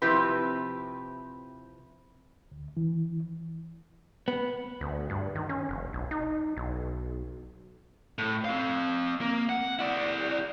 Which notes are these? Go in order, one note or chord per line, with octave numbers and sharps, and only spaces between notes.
C3 F3 C4 E4 G4 B4
D2
E3
B3
D2
G2
D#3
C#4
F1
B1
D#4
B1
A2
C4 F5
A#3
F#5
E4 D5